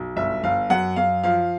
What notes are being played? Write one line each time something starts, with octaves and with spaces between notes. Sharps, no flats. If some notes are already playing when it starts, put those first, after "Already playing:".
Already playing: B1
G1 E5
G1 F5
F#2 F#5
F#2 F5
F3 F5